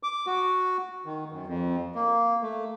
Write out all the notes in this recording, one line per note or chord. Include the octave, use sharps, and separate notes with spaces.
D6
F#4
D#3
F#2
F2
A#3
A3